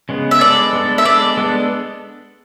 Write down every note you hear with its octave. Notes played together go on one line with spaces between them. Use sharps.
C#3 G#3 B3
E5
G#3 B3 D4 A4 D5
G#3 B3 D4 A4
E5
G#3 B3 D4 A4 D5
G#3 B3 D4 A4